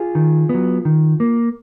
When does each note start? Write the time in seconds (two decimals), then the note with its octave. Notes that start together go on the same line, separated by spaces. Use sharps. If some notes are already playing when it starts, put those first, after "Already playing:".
Already playing: F4 G#4
0.15 D#3
0.49 B3
0.54 F#3
0.85 D#3
1.20 A#3